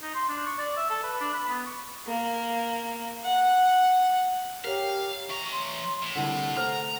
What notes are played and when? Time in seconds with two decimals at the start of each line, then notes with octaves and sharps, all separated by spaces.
0.02 D#4
0.15 C6
0.29 D4
0.46 C#6
0.59 D5
0.77 E5
0.90 A4
1.03 B4
1.21 D4
1.34 B5
1.49 B3
1.66 C#6
2.07 A#3
3.25 F#5
4.64 G4 A#4 C#5 F5
5.30 E3 A#5 C#6
5.52 C6
6.03 A2
6.16 C2 D3 F#5
6.57 A3 C5 A#5 F6